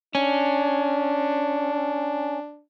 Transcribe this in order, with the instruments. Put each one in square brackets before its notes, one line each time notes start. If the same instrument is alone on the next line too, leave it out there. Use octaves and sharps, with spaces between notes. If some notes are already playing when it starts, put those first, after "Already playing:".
[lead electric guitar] C#4 [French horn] D4